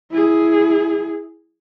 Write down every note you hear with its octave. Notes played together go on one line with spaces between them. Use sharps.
E4 G#4